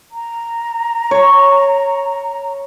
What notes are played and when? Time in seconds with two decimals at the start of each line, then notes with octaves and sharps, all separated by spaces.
0.11 A#5
1.11 C#5